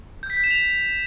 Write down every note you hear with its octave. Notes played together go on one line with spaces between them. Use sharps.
G6
B6
G6
E7
F7